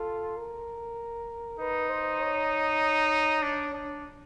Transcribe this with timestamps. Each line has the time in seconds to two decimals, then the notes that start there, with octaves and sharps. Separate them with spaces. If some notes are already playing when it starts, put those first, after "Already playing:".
Already playing: F4 A4
0.37 A#4
1.60 D#4 B4
1.89 C5
2.20 C#5
3.42 D4
3.73 D4